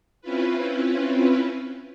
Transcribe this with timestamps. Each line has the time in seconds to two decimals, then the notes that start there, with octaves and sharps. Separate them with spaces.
0.21 C4 C#4 E4 F4 B4